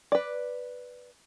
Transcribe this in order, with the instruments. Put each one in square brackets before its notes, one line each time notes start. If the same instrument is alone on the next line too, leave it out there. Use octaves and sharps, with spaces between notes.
[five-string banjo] B4 D5